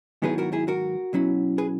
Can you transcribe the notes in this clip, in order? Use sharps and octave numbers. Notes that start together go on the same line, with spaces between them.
G#2 D#3 F#3 B3 E4 G#4 B4
F#4 A#4
E4 G#4
F#4 A#4
B2 F#3 C#4 E4
G#4 B4